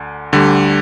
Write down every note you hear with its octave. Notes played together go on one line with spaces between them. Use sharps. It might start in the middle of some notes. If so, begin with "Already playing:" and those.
Already playing: D2 D3
D2 D3 G3